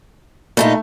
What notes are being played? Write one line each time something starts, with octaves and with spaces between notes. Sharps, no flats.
G2 A#2 A3 D#4